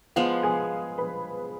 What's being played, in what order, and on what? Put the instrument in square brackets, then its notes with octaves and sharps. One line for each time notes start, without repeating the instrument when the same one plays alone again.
[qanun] F3 G#3 B3 [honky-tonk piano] F5
[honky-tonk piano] G#4 G#5
B4 B5